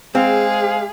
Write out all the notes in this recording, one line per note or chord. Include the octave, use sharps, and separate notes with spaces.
G#3 C4 G#4 F5